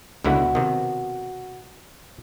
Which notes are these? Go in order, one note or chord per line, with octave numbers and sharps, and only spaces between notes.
C#2 B2 D3 E4 F#4
C3 D#3